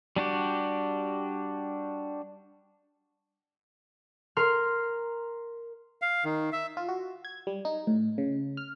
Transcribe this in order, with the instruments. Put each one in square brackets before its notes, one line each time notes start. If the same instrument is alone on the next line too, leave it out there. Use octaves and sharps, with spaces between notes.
[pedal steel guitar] G3 D4 F#4 G4
[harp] A#4 C6 F6
[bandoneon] F5
D#3
E5
[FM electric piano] F4
F#4
G#6
G3
D#4
A2
C#3
F6